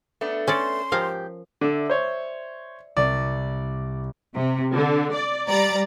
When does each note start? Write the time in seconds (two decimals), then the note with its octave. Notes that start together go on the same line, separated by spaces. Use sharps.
0.21 A3 B3 D4
0.48 C#4 A4 D5 C6
0.92 G#2 F3 G4 A#4 F5
1.61 D3 D5 E5
1.90 C5 C#5
2.97 C2 D5
4.34 C3
4.73 D3
5.13 D5
5.48 G3 D5 A#5 A6